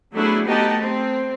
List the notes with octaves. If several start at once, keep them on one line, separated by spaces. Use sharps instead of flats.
F#3 A3 B3 D4 E4 G#4
A3 B3 D#4 G4 A5
C4